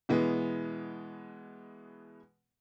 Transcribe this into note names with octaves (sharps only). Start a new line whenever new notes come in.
B2 E3 G#3 B3